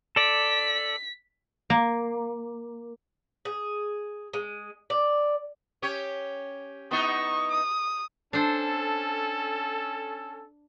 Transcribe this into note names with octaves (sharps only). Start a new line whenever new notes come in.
A4 D5 B6
A#3
G#4
G#3
D5
C#4 G4 C#5
B3 D#4 E4 C#6
D#6
C#4 D4 A4 C5